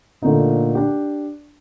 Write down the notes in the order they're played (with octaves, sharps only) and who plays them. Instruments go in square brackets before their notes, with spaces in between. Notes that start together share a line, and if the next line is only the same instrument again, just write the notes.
[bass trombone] A#2 [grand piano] D3 A3 D#4
[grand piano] D4 G4